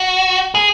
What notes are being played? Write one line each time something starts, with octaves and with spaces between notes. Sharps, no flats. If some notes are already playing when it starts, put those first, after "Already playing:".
Already playing: F#4
G#4